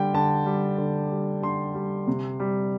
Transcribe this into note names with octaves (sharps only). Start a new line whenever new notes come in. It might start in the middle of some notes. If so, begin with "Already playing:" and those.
Already playing: D3 G3 G5
D3 A5
G3
D3
G3
D3 C6
G3
C3
G3